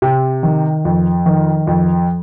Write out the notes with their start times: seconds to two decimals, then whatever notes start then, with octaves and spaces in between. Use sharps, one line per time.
0.02 C3
0.43 D#3
0.85 F2
1.26 D#3
1.67 F2